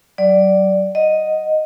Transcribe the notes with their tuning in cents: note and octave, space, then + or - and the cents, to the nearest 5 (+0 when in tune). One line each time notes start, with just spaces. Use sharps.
F#3 +35 D5 +0
D#5 +0 F#5 +0